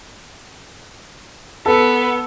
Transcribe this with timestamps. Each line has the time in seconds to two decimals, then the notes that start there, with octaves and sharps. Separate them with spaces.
1.66 B3 A4